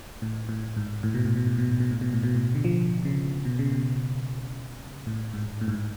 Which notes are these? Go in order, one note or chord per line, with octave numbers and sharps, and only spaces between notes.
A2
A2
G#2
A2
B2
A2
B2
A2
B2
A2
B2
A2
B2
A2
B2
A2
D3
F3
C#3
B2
C#3
B2
A2
G#2
A2
G#2
A2